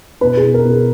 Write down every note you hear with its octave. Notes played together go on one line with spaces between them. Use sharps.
B2 B4
G#4
B2
A#4
B2
G#4